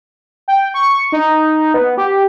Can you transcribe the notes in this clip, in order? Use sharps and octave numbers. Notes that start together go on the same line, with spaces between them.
G5
C#6
D#4
B3
G4